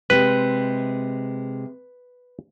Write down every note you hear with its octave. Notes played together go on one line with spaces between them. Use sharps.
C3 G#3 B4